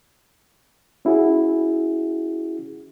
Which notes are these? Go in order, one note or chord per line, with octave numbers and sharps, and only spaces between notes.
C#4 E4 F#4 G#4